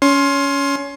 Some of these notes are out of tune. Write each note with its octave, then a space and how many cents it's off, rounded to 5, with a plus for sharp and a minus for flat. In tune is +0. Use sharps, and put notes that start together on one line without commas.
C#4 +20 C6 +20